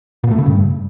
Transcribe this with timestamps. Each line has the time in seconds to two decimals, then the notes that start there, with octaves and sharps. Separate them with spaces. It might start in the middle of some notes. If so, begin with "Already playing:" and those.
0.24 A#2
0.31 A3
0.39 C#3
0.46 G2